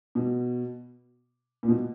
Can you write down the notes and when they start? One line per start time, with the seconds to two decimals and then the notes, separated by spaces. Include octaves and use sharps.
0.15 B2
1.63 A#2
1.68 B2